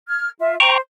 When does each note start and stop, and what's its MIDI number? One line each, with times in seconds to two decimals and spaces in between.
0.09 0.29 89
0.09 0.29 92
0.39 0.55 65
0.39 0.55 76
0.60 0.78 72
0.60 0.78 79
0.60 0.78 82
0.60 0.78 85